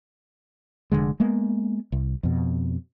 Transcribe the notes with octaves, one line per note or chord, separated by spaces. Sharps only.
F1 E2 D3 G#3
G#3 A#3 B3
C2
F2 B2